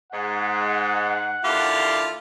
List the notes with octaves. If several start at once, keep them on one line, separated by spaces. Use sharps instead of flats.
G#2 F#5
D#2 D3 E4 F4 G4 F5